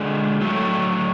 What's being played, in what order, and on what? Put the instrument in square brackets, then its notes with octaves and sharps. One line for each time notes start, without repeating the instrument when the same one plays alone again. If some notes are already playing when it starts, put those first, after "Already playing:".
Already playing: [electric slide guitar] D3 G#3 F#4
A2 F#3 A3